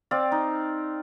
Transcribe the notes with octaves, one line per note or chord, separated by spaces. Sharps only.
C4 D5 F5
D#4